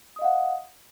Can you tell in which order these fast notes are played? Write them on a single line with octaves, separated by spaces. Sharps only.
D#6 D#5 F5 F#5